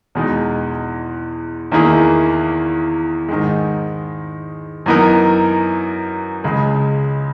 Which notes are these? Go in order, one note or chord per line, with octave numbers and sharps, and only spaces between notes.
E2 B2 G#3 D#4
E2 D#3 A#3 E4 G#4
G#2 D#3 G#3
F#2 E3 B3 D#4 A#4
C#2 C#3 G#3